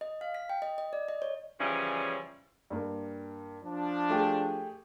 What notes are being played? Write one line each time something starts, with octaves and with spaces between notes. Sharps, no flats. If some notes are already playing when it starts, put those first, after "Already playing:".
D#5
F5
B6
G5
D#5
D#5
D5
D#5
C#5
C#3 E3 F3 G3 C#4
G2 A#3
F3 D4
A3 G4 G#4